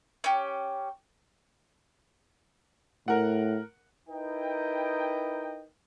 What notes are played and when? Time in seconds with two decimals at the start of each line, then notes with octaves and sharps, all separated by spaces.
0.24 C#4 G4
3.08 A2 A#4 F#5
4.09 D#4 E4 A#4 B4 D#5 G5